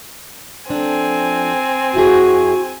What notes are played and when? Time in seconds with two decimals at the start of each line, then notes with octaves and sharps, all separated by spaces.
0.70 F3 A3 C4 D4 G#5
1.94 F2 E4 F#4 G#4